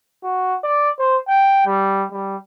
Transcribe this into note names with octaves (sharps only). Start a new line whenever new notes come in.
F#4
D5
C5
G5
G3
G3